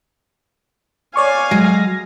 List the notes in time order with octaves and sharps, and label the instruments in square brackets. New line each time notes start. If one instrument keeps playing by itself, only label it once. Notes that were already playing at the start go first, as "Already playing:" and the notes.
[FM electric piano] C#5 D5 C#6 [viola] F5 G#5
[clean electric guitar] F#3 [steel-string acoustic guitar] G#3 [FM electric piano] A#6